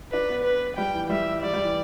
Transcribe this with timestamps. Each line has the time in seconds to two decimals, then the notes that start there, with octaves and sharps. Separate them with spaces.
0.12 D4 B4
0.29 B3
0.45 B4
0.77 G3 G5
0.94 E3
1.10 G3 E5
1.42 G3 D5
1.53 G3
1.64 E3